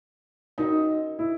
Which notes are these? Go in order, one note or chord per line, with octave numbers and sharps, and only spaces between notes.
C#4 D#4 F#4 A#4 D#5
E4